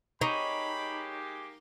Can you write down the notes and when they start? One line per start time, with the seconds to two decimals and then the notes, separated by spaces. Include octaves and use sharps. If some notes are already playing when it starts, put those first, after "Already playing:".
0.21 G#3 A#3 D#4 G4 C#5 B5